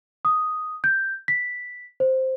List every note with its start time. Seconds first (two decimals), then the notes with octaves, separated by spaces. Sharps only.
0.25 D#6
0.84 G6
1.28 B6
2.00 C5